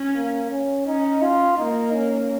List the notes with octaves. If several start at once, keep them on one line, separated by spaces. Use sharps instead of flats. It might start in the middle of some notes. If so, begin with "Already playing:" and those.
Already playing: C#4
A#3
C#4
C#4 D#4
F4
A#3 D#4
C#4